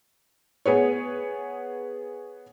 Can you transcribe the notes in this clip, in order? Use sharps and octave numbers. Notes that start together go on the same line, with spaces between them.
B3 G#4 B4 C#5